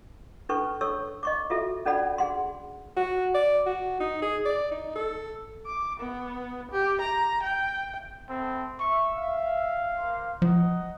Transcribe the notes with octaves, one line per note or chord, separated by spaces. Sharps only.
C#4 D4 A4 B4 C#6
A4 C#5 C#6 E6
D#5 C#6 D6
F4 F#4 A4 E5
C#4 D4 A4 D5 F#5 B5
G#4 F#5 C6
F#4
D5
F#4
D#4
G#4
D5
D#4
A4
D6
B3
G4
A#5
G5
B3 C4 A4 E5
E5 C#6
F5
A#3 C5
F3 D#4 D#5 F#5